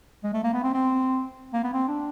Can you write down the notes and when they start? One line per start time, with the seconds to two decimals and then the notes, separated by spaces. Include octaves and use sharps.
0.24 G#3
0.34 A3
0.44 A#3
0.54 B3
0.63 C4
0.74 C4
1.54 A#3
1.64 B3
1.73 C4
1.88 D4